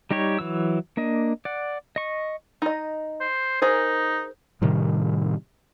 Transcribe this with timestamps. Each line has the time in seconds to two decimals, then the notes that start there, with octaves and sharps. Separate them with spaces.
0.11 G3 D#4 G4 C#5
0.39 E3 F#3 E6
0.97 A#3 D4 D#5
1.45 D5 F#5
1.96 D#5 C#6
2.62 D#4 D#5
3.21 C5
3.62 D#4 G#4 A#4 C5
4.62 A2 C3 D#3 G3